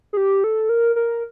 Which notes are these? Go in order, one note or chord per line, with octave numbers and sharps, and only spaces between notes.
G#4
G4
A4
A#4
A#4